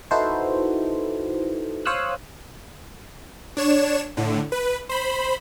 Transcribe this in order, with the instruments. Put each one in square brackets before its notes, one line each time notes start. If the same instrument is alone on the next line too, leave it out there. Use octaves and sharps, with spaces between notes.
[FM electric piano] D#4 E4 F#4 A4 B4 C5
C5 C#5 F5 D#6 E6 F#6
[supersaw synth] D4 C#5 E7
A2 D3
B4
C5 B5